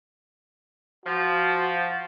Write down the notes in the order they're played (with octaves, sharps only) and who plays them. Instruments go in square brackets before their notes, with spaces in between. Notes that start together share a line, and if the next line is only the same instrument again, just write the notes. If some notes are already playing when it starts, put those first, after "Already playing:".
[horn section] F3 [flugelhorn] F#4